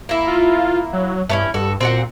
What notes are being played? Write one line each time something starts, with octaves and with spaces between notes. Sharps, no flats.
A#3 E4
F4
F#3
G2 A3 C#4 E4
G2 F#4 A4
A#2 C4 F#4 F#5